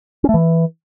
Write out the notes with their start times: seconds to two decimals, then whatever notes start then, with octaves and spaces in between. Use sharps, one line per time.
0.24 C#4
0.29 A3
0.34 E3